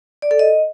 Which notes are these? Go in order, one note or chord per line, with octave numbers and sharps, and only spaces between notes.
D5
A4
D#5